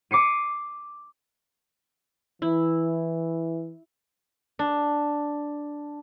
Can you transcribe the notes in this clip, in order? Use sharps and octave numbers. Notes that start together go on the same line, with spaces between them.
D6 C7 C#7 D#7
E3 E4
D4